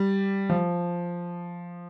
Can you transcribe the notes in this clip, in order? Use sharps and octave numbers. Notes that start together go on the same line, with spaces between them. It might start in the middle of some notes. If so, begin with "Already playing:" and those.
Already playing: G3
F3